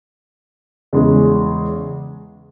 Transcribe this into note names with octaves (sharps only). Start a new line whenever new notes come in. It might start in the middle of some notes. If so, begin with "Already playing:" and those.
E2 C#3 G#3